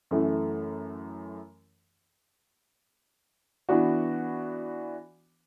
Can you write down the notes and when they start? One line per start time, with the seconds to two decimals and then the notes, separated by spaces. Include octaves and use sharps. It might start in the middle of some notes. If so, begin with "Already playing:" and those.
0.11 F#2 E3 A3
3.69 E3 B3 D4 F#4